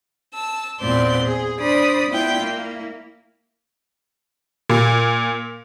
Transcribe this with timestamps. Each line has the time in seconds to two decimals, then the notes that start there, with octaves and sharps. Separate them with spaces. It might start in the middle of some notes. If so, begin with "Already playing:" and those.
0.34 A5 E6
0.81 E2 A#2 B3 C4 D5 C6
1.26 G#4
1.60 D4 C5 D5 B5 D#6
2.10 B3 E4 F4 D5 G5
2.41 A#3 E4
4.70 A#2